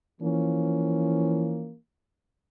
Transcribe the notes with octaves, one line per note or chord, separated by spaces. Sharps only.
E3 F3 A#3 C#4